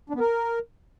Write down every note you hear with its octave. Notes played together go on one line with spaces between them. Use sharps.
D4
B3
A#4